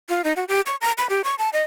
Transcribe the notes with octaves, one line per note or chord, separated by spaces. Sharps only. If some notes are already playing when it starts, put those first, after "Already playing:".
F4
D#4
F#4
G4
C#6
A#5
B5
G4
C#6
A5
D#5